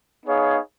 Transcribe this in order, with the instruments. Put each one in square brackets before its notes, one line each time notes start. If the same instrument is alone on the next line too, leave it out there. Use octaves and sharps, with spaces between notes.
[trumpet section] B3 D#4 G#4 C#5 F5